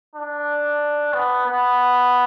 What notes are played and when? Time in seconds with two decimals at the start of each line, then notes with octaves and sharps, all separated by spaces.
0.16 D4
1.14 B3
1.46 B3